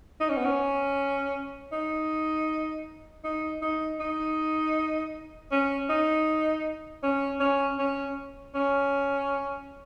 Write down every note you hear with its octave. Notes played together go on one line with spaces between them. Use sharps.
D#4
C#4
B3
C#4
D#4
D#4
D#4
D#4
C#4
D#4
C#4
C#4
C#4
C#4